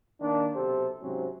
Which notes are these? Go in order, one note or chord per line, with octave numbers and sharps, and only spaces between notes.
D#3 A#3 D4
B1 C3 G4 A4 C5
G#2 C3 F#3 C4 C#4